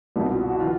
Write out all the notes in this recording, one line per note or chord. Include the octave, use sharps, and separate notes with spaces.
C2 B2 D#4
F4
F#4
F#4
E3 F4